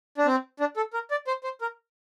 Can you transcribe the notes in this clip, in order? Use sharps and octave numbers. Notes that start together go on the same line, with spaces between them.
D4
C4
D4
A4
A#4
D5
C5
C5
A#4